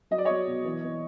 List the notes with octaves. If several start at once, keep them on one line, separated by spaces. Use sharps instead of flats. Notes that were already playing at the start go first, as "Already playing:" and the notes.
F#3 D#5
D5
F#3 C#5 D#5
B2
E3
E3